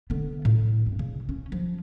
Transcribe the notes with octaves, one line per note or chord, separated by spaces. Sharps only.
D3 B3
A2
G2
C#3
C#4
F3